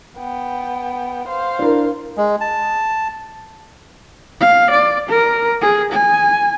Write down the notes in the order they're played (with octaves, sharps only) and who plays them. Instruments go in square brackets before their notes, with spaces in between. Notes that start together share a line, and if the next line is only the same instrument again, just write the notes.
[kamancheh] B3 G5
C5 F5
[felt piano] D4 E4 A#4
[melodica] G#3
A5
[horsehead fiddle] F5
D5
A#4
G#4
G#5